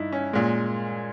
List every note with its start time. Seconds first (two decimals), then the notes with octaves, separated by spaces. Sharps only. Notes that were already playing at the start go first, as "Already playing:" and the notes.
Already playing: G2 D#4 E4
0.12 C#4
0.33 A#2 G#3